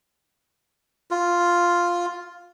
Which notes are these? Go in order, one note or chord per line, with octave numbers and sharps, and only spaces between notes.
F4